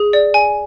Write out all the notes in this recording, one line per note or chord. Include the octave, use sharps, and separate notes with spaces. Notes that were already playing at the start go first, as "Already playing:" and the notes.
Already playing: G#4
D5
G#5